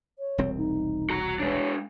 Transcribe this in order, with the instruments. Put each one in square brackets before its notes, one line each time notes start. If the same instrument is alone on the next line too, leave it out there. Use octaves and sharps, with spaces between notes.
[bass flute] C#5
[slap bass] E1 C2 C4
[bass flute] D#4
[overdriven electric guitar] F#4 A#5
[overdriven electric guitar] G#3 D4 [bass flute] C#5